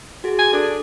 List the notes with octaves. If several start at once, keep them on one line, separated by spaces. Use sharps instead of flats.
F#4 G#4
G#5
D4 A4